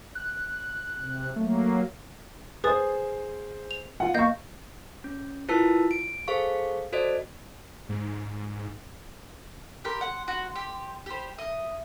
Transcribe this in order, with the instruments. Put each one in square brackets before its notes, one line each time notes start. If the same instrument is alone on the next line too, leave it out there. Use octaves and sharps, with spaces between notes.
[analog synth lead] F#6
[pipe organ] C3
[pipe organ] F#3 A#3 [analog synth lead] A3
[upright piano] G#4 C5 [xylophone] B4 D#6 A6
[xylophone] F7
[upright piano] F4 F#5
[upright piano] A#3 C#6 [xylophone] D#5 F5 G6
[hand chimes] C#4
E4 F4 A#4 B4 A5 E6
D7
G#4 A4 C5 F5 C#6
F#4 A4 C5 D5 D#5
[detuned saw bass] G#2
[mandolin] G4 A#4 [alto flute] C6
[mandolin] F#5
F#4
G4
G4 C5
[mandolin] D#5 [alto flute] E5